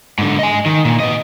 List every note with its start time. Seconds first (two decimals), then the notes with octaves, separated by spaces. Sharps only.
0.18 G#2 D3
0.39 D#5 G#5
0.66 D#3
0.85 A#2
1.00 B4 D#5